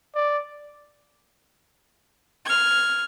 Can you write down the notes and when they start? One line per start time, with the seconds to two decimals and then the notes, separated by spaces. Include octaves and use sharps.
0.15 D5
2.45 F6 G#6